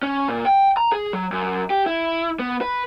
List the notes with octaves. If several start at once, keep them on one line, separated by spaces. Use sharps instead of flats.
C#4
A#2
G5
A#5
G#4
F#3
F#2
G4
E4
B3
B4